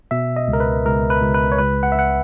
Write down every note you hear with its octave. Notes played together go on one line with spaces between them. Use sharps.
B2 E5
D#5
C#2
A#4
B4
C#2 A#4
B4
C#2
B4
C#5
C#2 B4
F#5
E5
C#2 F#5